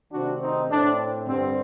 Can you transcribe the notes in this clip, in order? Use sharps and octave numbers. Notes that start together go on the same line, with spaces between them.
C3 D#3 A3 C4 D4 F#4
C4 D#4
A2 A3 C4 D4
G2 D3 G3 C4